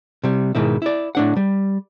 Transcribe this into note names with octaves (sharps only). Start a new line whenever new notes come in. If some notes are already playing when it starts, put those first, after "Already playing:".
C3 G3
G#2 B2 D#3 E4
E4 D5
A2 D4 F#5
G3